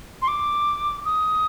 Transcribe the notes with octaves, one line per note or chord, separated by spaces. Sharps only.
C6
D6
D#6